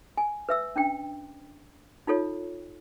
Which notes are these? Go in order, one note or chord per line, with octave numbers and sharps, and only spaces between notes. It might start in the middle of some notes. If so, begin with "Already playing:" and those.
G#5
B4 E5 E6
C#4 D4 G5
D#4 F4 A4 C#5